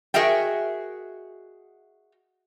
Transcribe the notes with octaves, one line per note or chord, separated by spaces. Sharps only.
F#4 G#4 A#4 D#5 E5 G5